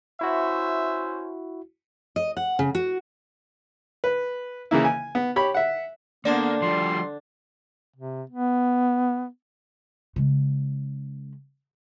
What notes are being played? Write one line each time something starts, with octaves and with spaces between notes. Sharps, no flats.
C#4 E4 F#4 C5 E5
D#5
F#5
C#3
F#4
B4
C#3 E3 A#3 E4
G#5
B3
G4 C#5 B5
E5 F#5
D3 A#3 B3 D4 C5 D5
F3 G3 C6
C3
B3
C#3 G#3